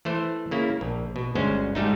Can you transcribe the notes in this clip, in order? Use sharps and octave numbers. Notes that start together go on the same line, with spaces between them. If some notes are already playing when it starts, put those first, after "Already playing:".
E3 A3 C5
C#3 A#3 E4
A#1
B2
G1 D2 G#3 C#4 C5
G#2 G3 A3 D#4